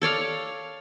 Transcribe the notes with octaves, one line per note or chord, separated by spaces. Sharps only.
A4 C#5 D5 F5